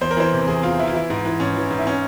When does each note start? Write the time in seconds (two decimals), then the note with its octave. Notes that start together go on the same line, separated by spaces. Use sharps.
0.01 E2 C5
0.11 A#4
0.17 E3 C5
0.33 C3
0.47 E2 G#4
0.63 E2 F4
0.79 E3 E4
0.87 F4
0.94 E3 E4
1.10 G#2
1.25 E3
1.40 G#2 C#4
1.56 E3
1.71 G#2
1.79 E4
1.87 C#4